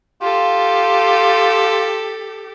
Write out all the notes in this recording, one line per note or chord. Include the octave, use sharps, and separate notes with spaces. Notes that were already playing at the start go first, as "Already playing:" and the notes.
F4 G4 A4